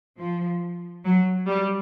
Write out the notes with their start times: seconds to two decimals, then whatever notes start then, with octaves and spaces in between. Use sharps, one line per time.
0.19 F3
1.05 F#3
1.47 G3